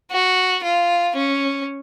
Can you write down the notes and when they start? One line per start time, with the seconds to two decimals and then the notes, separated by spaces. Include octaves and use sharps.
0.12 F#4
0.64 F4
1.16 C#4